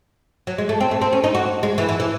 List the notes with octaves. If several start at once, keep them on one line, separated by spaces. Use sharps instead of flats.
F#3
G#3
A3
C4
A3
C4
C#4
D#4
F#4
G#3
E3
E3
E3